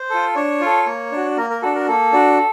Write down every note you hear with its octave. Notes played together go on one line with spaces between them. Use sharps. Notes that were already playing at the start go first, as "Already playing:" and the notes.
Already playing: C5
F4 A4
D4 C#5
F4 A4
A#3
D4 F#4
A#3 A#4
A#4
D4 F#4 A4
A#4
A#3 A4
D4 F#4